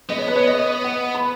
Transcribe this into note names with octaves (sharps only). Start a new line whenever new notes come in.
B3 D#5
C#5
B4
C#5
D#5
F#5
B5